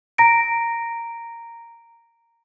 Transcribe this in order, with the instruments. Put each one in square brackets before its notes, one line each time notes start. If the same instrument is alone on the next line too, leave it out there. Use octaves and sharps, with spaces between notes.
[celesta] A#5 A#6 D7